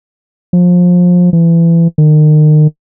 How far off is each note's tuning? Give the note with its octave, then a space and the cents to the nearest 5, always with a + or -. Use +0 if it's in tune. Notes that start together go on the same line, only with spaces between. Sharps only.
F3 +25
E3 +25
D#3 -35